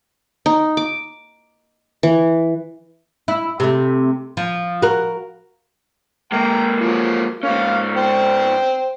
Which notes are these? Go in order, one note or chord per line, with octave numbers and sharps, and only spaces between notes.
D#4
D6
E3
E4
C3 A3
F3
F#4 A#4
G#3 A#3 G5 A#5
F3 F#3
G#2 A#3 C#4 F5
C5 G5